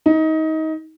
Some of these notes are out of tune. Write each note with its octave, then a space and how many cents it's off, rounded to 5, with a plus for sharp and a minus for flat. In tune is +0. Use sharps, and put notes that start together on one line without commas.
D#4 +25